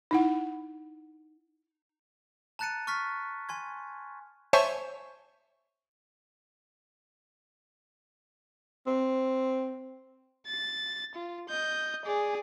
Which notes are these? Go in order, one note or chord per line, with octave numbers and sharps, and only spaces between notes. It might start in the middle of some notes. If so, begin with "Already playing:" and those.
D#4 E4 F#5
A5 A#5 F#6 A6 C#7 D#7
C#6 F6 A6 B6
G#5 C6 G#6
C5 C#5 E5 G#5 A5 C#6
C4
A6
F4
D#5 G6
G#4 D5